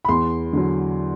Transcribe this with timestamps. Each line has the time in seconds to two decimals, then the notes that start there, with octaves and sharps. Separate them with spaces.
0.05 B5
0.08 E2 C6
0.53 D3 F#3